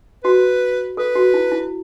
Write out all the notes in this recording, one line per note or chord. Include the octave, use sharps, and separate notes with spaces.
F#4 B4
A4 B4
F#4
E4
E4